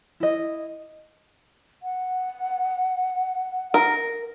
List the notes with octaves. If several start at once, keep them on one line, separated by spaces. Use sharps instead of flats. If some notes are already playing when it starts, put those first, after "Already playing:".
E4 D#5
F#5
A#4